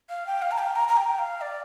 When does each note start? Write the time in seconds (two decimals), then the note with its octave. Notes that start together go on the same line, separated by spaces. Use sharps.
0.09 F5
0.27 G5
0.42 F5
0.51 A#5
0.58 G5
0.76 A#5
0.88 A#5
0.97 G5
1.08 G5
1.19 F5
1.41 D5